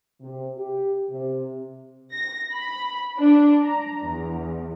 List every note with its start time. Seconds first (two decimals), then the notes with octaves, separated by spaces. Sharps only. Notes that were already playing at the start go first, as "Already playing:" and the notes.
0.21 C3
0.58 G4
1.10 C3
2.13 A#6
2.53 B5
3.18 D4
3.63 A#5
4.07 E2